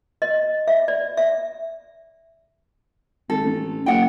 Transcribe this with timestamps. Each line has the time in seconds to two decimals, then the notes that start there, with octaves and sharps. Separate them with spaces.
0.22 D#5
0.68 E5
0.88 D5
1.17 E5
3.30 G#1 A4
3.42 A1
3.86 F#1 F#5 G5